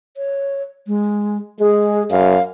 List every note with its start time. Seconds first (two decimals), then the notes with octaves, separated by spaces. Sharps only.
0.17 C#5
0.87 G#3
1.60 G#3 G#4
2.11 F#2 F5